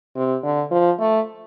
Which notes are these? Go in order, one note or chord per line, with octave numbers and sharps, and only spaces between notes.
C3
D3
F3
A3